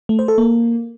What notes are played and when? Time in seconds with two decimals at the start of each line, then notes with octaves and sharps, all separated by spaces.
0.09 A3
0.19 C5
0.28 A4
0.38 A#3